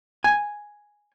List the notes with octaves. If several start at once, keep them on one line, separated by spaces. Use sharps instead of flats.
G#5